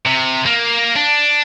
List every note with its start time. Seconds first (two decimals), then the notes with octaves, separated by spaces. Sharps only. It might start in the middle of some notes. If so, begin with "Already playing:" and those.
0.06 C3
0.45 A#3
0.96 D4